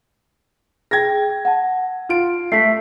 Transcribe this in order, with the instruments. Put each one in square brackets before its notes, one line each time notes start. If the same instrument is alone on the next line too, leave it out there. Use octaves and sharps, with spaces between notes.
[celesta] G#4 G5 [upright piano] G#6 A#6
[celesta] F#5 A5
[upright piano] F4 D7
[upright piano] A3 [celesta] B6 C7